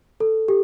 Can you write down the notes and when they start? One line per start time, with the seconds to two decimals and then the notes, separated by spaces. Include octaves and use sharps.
0.20 A4
0.48 G4